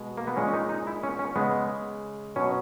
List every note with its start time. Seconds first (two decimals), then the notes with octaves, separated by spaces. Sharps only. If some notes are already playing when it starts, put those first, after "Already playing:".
Already playing: B2 G#3
0.17 A#3
0.27 B3
0.36 A#2 G#3 C#4
0.47 C#4
0.53 D#4
0.69 D#4
0.87 E4
1.03 C#4
1.19 C#4
1.36 C#3 G#3 B3
2.36 B2 F#3 C#4